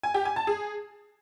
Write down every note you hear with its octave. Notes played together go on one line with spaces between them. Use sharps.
G#5
G4
G#5
A5
G#4